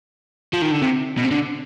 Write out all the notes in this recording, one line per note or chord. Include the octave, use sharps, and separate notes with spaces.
F3
D#3
D3
C3
B2
C3
D3